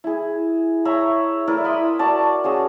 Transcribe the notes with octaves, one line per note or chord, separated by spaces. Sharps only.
E4 G#4
C#5 E5 A#5 B5
E4 A#4 B4 D5
E5 B5 C6 D#6
F#4 A#4 D5 A5
C#4 F#4 G#4 A#4